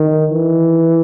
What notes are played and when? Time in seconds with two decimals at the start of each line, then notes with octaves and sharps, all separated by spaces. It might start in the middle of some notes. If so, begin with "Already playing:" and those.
Already playing: D#3
0.30 E3